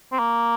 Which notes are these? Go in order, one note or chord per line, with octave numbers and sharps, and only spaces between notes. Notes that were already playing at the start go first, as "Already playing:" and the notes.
C4
A#3